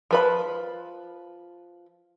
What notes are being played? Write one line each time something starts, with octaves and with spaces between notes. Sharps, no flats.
F3 B4 B5